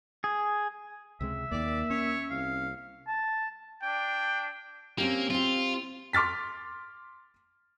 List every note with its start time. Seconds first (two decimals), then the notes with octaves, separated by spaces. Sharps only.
0.24 G#4
1.21 C#2 C3 G#3 E5
1.51 D#2 D#3 A#3 D5
1.90 C#4 C#5
2.30 C2 F5
3.07 A5
3.82 D4 G5
4.98 A#3 C4 C#4 G4
5.30 C4 F4 G4
6.13 C6 D6 F6 A6 B6